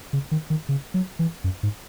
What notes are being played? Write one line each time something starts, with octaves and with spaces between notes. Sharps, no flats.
C#3
D#3
D#3
C#3
F#3
E3
F#2
G#2